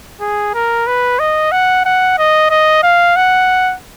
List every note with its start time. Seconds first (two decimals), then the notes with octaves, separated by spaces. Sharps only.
0.21 G#4
0.54 A#4
0.87 B4
1.19 D#5
1.52 F#5
1.85 F#5
2.18 D#5
2.50 D#5
2.83 F5
3.16 F#5